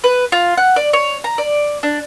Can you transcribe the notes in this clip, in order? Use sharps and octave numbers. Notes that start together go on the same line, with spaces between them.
B4
F4
F#5
D5
C#5
A#5
D5
D4